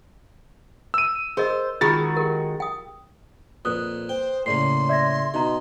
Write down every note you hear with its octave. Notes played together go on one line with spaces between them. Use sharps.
E6 D#7
G#4 A#4 C5 D#5
D#3 G#3 F4 F#4 G#4 A6
G4 A#4
G5 D#6
F2 A#2 B4 D#6 F#6
C5 G5
A2 C#3 A#3 D5 C6 C7
D5 E5 G#6 A#6
B2 D#4 D#5 A#5